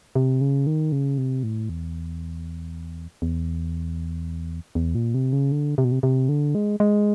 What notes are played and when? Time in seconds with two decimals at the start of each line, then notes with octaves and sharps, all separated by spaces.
0.15 C3
0.41 C#3
0.67 D#3
0.92 C#3
1.18 C3
1.43 A2
1.69 E2
3.22 E2
4.75 E2
4.95 A#2
5.14 C3
5.33 C#3
5.52 D3
5.78 C3
5.84 B2
5.92 C3
6.03 C3
6.29 D3
6.55 G#3
6.80 G#3